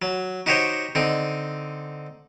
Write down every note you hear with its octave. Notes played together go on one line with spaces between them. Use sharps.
F#3
D#4 F#4 G4 C5 C#5 D#5
D3 C4 D#4